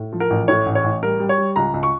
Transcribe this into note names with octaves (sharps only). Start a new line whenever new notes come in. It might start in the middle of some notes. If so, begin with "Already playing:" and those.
Already playing: A2
F3
A#4
A1
A2 C#5
A1
C#5
A1
G3 A#4
G3
C#5
G3
C#2 A#5
C#2
C#6